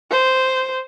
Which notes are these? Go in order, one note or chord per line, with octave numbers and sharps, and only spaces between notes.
C5